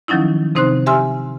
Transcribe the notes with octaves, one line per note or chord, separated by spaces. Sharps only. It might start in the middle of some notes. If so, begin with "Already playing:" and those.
D#3 F3 F#3 C#4 D#4 E4
C3 C4 D#4 C5 C6 F#6
G4 E5 G#5 C6 E6 F6